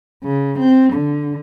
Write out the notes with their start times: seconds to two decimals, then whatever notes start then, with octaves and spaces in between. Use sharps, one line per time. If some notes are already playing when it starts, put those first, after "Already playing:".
0.24 C#3
0.59 C4
0.93 D3